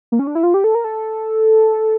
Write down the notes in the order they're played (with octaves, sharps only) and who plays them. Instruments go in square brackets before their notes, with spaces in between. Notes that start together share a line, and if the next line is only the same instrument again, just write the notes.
[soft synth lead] A#3
C#4
D4
E4
F4
G4
A4
A#4
A4